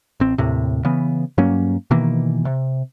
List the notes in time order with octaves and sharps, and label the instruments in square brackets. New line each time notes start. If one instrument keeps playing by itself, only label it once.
[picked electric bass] A1 C4
D#2 A2 C3
C#3 E3 B3
G2 F#3 A#3 C#4
B2 D#3 E3 A#3
C3